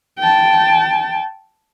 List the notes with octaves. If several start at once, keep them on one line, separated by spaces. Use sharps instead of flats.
G5 A5